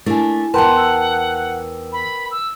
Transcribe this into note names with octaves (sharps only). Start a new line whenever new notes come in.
A3 A#3 D4 E4 G#5
E2 G2 A#4 B4 F#5 G5 A5 C6
E6
B5
E6